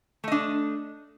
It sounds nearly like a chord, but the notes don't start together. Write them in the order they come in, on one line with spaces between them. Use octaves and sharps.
A3 D#5 D4